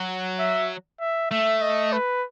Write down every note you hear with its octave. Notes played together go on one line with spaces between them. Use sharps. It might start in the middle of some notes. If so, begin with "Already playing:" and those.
Already playing: F#3
E5
E5
A3 E5
D#5
B4